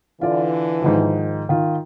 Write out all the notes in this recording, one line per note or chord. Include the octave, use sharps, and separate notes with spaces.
D3 E3 F4 D5
G#2 D#3 F3
D#3 F4